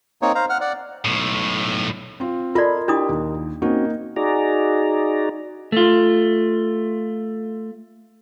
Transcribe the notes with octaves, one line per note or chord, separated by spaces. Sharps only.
A#3 C4 D#4 C#5
C5 F5 A#5
F#5 F6
D5 F#5
B1 A2
C4 F4
F4 A4 A#4 D5 D#5 B5 C6
D4 E4 G4 D#6
D#2
A#3 C4 C#4 D#4 F#4
D#4 F#4 G#4 D5 A#5
A3 F4